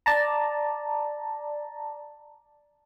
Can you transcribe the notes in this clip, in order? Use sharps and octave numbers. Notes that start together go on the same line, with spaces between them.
D5 A5 A#5